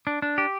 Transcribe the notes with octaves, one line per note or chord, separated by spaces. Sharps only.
D4
D4
G4